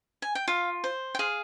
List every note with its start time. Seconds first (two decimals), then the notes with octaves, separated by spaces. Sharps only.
0.22 G#5
0.35 G5
0.48 F4 F5
0.84 C5
1.15 G5
1.19 G#4 F5